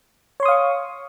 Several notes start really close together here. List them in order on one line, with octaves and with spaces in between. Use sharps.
C#5 C6 D#6 F5 C#6